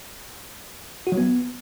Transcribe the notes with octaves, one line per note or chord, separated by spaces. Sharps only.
F#4
F#3
B3